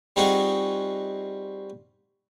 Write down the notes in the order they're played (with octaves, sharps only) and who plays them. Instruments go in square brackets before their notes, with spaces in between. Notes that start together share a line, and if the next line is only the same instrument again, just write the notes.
[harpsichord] G3 C4 D#4 F4 F#4 G#4